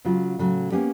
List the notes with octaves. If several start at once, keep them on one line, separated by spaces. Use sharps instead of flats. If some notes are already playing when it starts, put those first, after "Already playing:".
C#3 F#3 G#3 F4
A2 C#3 F#3
A#3 B3 C#4 G4